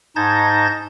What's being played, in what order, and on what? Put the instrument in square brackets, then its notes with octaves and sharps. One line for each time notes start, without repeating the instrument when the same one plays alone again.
[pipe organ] G#2 D#4 A5 G6 G#6 A#6